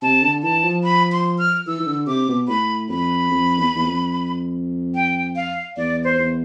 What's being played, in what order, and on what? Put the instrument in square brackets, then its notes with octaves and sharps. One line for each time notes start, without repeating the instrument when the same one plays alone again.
[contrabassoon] C3 [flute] A5
[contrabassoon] D3
[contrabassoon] E3 [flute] A5
[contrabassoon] F3
[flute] B5
C6
F6
[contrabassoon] E3 [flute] E6
[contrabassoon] E3
D3
[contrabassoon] C3 [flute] D6
[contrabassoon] B2
[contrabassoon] A2 [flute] B5
[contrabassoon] F2 [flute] B5
[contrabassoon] F2
E2
E2
F2
[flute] G5
F5
[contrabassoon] E2 [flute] D5
[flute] C5
[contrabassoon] E2